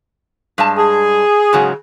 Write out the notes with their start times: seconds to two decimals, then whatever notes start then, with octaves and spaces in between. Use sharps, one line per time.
0.58 G2 G#3 A5
0.77 G#4
1.53 G#2 C#3 F#3